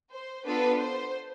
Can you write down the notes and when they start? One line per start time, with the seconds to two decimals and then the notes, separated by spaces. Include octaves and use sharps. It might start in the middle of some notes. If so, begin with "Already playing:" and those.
0.12 C5
0.46 B3 D4 F4 A4 B4
0.78 C5